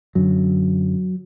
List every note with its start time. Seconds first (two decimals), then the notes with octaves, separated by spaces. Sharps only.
0.15 F#2 D3 F#3